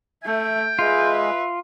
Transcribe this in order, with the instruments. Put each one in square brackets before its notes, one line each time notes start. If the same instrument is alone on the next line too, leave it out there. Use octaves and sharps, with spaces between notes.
[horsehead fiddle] A3 E5 [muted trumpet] G5
[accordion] G#3 [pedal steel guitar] F4 [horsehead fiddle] B4 E5